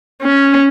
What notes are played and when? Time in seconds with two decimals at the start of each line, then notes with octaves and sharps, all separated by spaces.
0.23 C#4